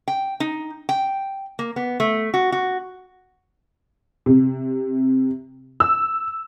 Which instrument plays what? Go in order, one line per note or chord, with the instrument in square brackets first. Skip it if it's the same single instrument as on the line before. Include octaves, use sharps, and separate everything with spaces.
[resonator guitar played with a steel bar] G5
D#4
G5
A#3
B3
A3
F#4
F#4
[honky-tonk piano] C3
E6